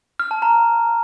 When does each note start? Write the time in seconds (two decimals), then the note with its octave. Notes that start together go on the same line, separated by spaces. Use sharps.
0.20 F6
0.31 A5
0.42 A#5